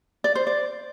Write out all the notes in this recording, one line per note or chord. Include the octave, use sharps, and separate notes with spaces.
D5
C5
D5